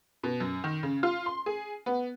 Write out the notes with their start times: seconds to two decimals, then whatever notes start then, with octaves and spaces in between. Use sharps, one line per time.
0.23 B2
0.40 F#2
0.64 D#3
0.83 C#3
1.03 F4
1.26 C6
1.46 G#4
1.86 B3